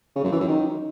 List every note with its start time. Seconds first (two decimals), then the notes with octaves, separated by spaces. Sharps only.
0.16 C#3
0.24 F#2
0.32 E3
0.40 F#2
0.48 D#3